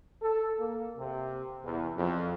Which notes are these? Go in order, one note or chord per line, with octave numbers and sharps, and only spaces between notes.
A4
A#3
C3
E2
F2